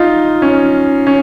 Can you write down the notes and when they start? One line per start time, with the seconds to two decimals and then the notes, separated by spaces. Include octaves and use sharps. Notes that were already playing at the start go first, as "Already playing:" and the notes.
Already playing: D#4 F4
0.42 C#4
1.07 C#4